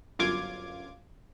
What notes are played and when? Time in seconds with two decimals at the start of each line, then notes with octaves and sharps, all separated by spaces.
0.19 G1 F#2 F4 D6 G#6